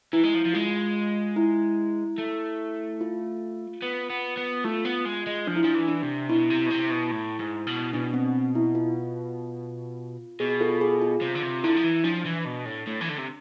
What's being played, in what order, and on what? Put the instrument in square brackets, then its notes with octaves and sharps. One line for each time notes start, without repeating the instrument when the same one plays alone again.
[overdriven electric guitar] E3 [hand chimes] E4
[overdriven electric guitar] G#3
F3
F3
[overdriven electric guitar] G#3 [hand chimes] F4
[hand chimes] E4
[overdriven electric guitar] A3
[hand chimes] F4
[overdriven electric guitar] B3
B3
B3
[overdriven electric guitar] A3 [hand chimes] F4
[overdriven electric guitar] B3
G#3
G#3
[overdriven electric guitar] F3 [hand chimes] D4
[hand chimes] E4
[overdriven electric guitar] F3 [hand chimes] D4
[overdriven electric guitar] E3
[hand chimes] D4
[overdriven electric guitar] C3
[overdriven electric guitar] B2 [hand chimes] E4
[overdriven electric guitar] C3
B2
C3
B2
A2
G#2
B2
[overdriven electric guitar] B2 [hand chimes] D4
[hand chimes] C4
E4
F4
[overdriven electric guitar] B2 [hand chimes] G#4
[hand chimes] F4 A4
G#4
F4
[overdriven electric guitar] C3 [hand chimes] F4
[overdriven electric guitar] D3
C3
[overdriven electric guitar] D3 [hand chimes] E4
[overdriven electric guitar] F3
E3
[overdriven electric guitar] F3 [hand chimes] D4
[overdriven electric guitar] E3
B2
A2
A2
E3
D3
C3